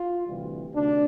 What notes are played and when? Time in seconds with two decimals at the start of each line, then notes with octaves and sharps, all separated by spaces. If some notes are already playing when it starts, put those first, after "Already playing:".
Already playing: F4
0.26 D2 C3 E3 G3
0.75 D2 C3 D4